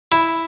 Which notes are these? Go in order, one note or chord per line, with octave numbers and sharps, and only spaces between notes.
E4